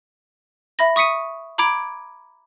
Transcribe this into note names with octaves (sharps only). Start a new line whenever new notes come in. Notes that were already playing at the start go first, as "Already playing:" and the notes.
E5 B5 A#6
C#6 D#6 B6 C#7 D#7
A#5 B5 D6 G#6 D7